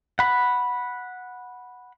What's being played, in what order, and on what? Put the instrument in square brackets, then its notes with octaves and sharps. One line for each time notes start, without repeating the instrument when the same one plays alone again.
[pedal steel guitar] F#5 B5